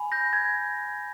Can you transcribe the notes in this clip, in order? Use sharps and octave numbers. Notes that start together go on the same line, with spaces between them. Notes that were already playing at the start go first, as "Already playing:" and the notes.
Already playing: G#5 B5
G6 A#6
G#6